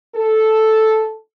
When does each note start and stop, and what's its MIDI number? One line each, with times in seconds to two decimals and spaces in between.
0.15 1.18 69